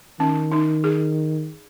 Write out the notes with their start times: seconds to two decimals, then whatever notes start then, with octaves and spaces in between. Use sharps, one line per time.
0.20 D#3 C#4
0.52 D#4
0.84 G#4